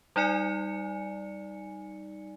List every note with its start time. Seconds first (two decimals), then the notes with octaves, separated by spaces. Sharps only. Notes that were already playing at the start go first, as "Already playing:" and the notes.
0.16 G3 D#4 D5 G#5 C#7